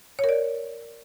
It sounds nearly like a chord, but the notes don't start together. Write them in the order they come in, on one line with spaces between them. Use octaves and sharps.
C#5 A#4 D5